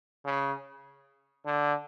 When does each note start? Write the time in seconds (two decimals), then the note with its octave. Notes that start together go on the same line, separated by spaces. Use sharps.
0.25 C#3
1.46 D3